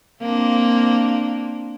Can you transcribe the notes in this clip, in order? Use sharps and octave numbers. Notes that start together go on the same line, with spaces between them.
A#3 C4 D4